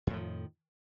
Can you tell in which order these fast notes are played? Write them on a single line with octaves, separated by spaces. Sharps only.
F2 A2 F3 D#3